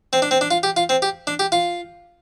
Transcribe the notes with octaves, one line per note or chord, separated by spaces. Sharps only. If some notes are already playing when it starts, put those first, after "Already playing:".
C4
D4
C4
D4
F4
G4
F4
C4
G4
D4
G4
F4